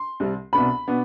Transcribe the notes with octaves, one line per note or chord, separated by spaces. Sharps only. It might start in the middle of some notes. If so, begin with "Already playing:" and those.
Already playing: C6
C2 C3 G3
C2 B2 B3 D4 B5
B2 B3 D4